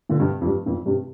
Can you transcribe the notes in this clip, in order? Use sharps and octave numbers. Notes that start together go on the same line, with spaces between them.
A#2 D3
G2 C3
F2
G2
F2 A#2
G2 C3